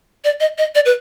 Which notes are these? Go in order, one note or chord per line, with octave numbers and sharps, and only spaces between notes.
D5
D#5
D#5
D5
B4